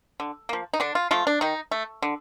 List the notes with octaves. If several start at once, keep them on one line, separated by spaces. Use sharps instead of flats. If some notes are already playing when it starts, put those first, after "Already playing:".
D3
F3 A#3
D#4
D3 D4
F4
F3 A3 F4
D4
D#3 D#4
A3
D3